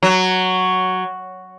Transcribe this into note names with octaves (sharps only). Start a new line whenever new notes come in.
F#3